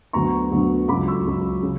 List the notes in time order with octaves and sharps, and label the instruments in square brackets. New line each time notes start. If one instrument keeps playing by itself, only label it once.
[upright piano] D2 D3 F#3 B3 A#5 C#6
D2 D3 F#3 B3
C#2 C#3 F#3 B5 D6
C#6 E6
C#2 C#3 F#3
C#3